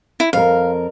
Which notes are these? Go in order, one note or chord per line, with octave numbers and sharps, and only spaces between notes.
E4
F2 A#4 F5